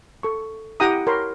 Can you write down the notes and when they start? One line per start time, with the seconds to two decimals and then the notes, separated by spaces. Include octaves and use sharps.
0.23 A4 C#6
0.80 E4 G4 F#5 G5 A#5 D#6
1.07 A#4 C#5 G5 B5 C6